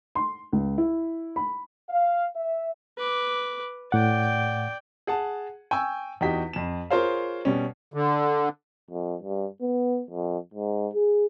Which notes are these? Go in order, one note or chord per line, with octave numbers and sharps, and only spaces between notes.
C6
C#2
E4
B5
F5
E5
B4 D6
A2 D5 F#5 G5
G#4 F#5 A5
G5 G#5 C#6 E6
E2 D#4 F#4 G4 B6
F2 E7
F4 G#4 A#4 C5 C#5 F5
B2 G3 C#4
D3
F2
G2
B3
F2
G#2
G#4